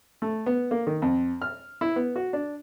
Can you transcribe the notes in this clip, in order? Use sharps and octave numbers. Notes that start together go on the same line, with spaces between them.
A3
B3
A#3
D#3
F2
F6
E4
B3
F#4
D4